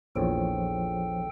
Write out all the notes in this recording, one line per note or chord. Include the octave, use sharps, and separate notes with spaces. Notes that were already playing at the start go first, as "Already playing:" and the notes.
A#1 E2 A#2 F3 A4 C5 C#5 G5